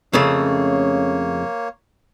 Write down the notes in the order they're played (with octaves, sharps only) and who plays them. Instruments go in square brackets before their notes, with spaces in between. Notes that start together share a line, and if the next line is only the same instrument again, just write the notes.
[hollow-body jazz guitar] F2 C#3 A3 [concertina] A#3 C#5 [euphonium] C#4